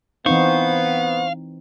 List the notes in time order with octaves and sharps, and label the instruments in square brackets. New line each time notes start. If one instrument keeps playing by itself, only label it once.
[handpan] E3 C4 D#4 [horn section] B3 [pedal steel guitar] C5 C#6 [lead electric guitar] F5